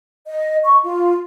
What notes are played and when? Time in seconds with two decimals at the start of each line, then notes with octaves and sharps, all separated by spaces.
0.27 D#5
0.65 C#6
0.84 F4